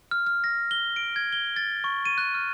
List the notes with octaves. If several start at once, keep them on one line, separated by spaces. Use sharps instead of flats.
F6
F6
A#6
G7
D7
G#6
G7
A6
C#6
D#7
F#6
F6